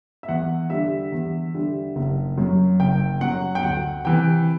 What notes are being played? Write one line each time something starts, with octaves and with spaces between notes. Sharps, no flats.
E5
E2 F#5
D3 G3 E5
E2
D3 G3
F#1
F#2 F#3
F#1 G5
F#2 F#3 F#5
G5
D2 F#5
C3 E3 G5